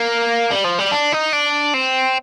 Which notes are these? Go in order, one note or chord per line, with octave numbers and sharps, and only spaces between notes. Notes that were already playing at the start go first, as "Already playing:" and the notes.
Already playing: A#3
G3
F3
G3
D4
D#4
D4
C4